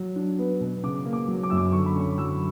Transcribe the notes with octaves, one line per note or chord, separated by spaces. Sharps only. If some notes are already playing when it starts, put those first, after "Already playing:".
Already playing: F#3
D4
B3
B2
C#3 D6
A#3
D6
F#3
D6
F#2 E6
D6
D3 C#6
B5
C#4 C#6
F#3 E6